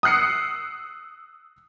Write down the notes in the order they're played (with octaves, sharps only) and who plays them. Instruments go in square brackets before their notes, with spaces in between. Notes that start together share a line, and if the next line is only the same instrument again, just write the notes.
[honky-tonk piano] D#6 E6 F#6 C7 C#7